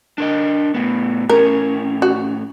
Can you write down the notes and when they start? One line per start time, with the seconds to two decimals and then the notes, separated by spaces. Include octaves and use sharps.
0.18 D4 A#4 D#5
0.74 A2 B3
1.29 A2 C#4 A#4
2.02 F#4